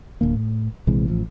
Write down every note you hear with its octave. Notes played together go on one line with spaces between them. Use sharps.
D1 D3 A#3
A2
A#1 C3 E3 G#3
A1 F3